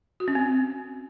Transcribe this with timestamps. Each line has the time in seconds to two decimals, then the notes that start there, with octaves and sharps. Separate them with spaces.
0.20 F#4
0.28 C#4
0.35 C4